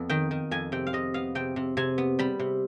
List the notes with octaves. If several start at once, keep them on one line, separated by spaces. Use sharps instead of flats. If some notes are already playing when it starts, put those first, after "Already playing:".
Already playing: F2 B3
D#3 G5
D#3
F2 G#5
C3 G5
F5
C3 D#5
B3 F5
C3 G5
C3
C3 G#5
B3
G3 B5
C3